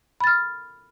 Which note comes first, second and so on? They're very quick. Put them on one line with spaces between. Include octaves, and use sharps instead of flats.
B5 A6 F6